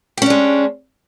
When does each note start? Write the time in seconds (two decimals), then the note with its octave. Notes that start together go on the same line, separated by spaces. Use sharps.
0.17 G4
0.22 C#4
0.26 D4
0.30 G#3